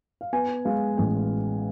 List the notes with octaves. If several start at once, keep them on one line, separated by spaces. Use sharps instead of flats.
F5
B3 G#5
G#3 F5
A1 G#5